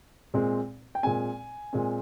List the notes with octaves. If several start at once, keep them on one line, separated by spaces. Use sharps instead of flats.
A#2 G#3 C4
G5
A#2 G#3 C4 G#5
A#2 G#3 C4